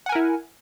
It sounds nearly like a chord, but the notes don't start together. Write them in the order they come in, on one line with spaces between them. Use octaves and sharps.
F#5 G#5 A#4 E4